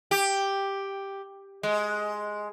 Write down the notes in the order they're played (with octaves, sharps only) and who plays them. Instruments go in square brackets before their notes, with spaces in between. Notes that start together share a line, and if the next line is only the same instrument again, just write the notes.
[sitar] G4
G#3